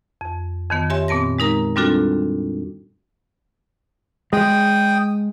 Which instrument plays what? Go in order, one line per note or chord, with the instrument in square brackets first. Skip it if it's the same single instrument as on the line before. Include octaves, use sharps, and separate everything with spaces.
[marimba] F2
F2 D#3 B3
G4 C#5 E5 G#5 C6
A#2 B3 C4 A5 A#6
G#3 D#4 A#4 A#5
G3 C4 D4 F4 F#4 A4
[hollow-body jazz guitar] G#3 [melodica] G5 D#6